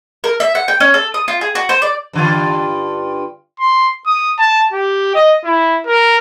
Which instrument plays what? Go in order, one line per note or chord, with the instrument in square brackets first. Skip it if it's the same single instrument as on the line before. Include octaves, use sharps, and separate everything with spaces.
[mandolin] A#4
E5
F#5
G5
C#4
A4
D#6
F4
G#4
F#4
C5
D5
[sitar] G2 D3 F4
[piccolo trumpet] C6
D#6
A5
G4
D#5
E4
A#4